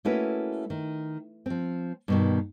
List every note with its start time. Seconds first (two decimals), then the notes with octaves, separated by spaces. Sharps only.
0.05 A3 A#3 C#4 E4 F#4 B4
0.70 D#3
1.46 F3 C4
2.08 G2 B2 D#3